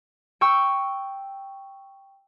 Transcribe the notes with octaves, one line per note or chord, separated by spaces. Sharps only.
G5 C#6 E6